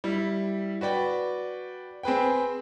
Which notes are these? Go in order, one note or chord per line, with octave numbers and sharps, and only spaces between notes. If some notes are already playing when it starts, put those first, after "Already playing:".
G3 E4
F#4 B4 D5 G5
C4 G#4 B4 G5